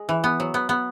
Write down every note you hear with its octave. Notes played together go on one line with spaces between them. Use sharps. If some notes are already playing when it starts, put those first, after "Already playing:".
Already playing: G#3
E3
B3
F#3
B3
B3